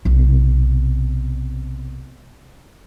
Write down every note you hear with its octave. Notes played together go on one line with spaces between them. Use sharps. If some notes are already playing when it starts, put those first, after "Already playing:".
B1 C3